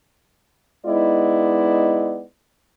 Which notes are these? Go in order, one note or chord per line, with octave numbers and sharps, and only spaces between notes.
G#3 B3 D#4 E4 D5